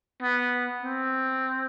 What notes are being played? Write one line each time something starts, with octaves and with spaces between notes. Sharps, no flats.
B3
C4